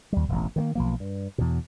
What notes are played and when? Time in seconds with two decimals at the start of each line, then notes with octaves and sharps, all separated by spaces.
0.12 D#2 G3
0.29 E1 A1
0.56 D#3 G#3 A#3
0.75 B1 F3 A#3
1.00 G2
1.38 E2 B2